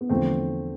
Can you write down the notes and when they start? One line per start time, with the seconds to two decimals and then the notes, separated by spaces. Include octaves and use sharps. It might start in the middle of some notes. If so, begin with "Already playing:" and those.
0.01 B3
0.09 E2 D3 F3 A3 C4